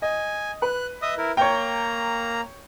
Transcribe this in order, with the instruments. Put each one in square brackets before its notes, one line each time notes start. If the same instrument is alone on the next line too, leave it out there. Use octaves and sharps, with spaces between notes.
[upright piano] D#5 [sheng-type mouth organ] G#5
[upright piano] B4 [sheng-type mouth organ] F#6
[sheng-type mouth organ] D#5 E5 D#6
E4 A#4
[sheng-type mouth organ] A#3 A#5 [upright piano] C#5 G5